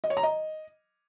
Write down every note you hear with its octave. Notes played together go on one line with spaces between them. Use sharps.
D#5
C#5
A#5
D#5